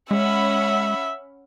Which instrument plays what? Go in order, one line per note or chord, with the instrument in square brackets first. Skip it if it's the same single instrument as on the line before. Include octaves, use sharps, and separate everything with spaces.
[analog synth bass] G#3 [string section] C#4 F#5 B5 [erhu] E5